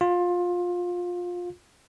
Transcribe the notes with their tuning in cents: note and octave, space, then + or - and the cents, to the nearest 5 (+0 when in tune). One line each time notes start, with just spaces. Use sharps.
F4 +20